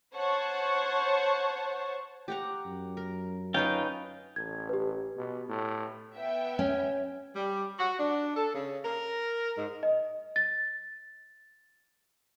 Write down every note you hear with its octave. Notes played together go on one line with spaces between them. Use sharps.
C5 C#5 F#5 A5 C#6
G4 F#5 A#5
F#2
A#4
C#4 D#4 F4 B4 G5
A1 G#6
G4 B4
B2
A2
B3 E5 G5
C#4
G3
F#4
D4
A4
C#3
A#4
G#2
D#5
A6